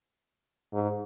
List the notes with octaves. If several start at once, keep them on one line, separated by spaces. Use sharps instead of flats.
G#2